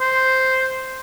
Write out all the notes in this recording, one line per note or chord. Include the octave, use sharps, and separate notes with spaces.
C5